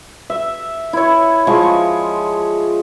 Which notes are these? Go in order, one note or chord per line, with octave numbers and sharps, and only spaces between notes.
E5
E4 C#5
F3 G#3 C#6
C#6